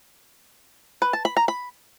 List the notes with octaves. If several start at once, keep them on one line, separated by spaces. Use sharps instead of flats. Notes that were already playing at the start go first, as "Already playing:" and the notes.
B4
A5
B5
A#5
B5